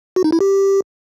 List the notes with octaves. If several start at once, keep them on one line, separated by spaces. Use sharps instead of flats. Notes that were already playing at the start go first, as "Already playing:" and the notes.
F#4
D#4
E4
G4